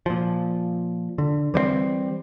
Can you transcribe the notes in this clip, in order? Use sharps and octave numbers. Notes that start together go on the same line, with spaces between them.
A#2 F3
D3
E3 G3 A3 C4